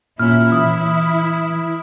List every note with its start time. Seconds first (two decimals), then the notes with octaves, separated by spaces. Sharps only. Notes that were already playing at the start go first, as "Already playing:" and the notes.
0.19 A#2 C#4 E4 F6
0.52 E3 D#6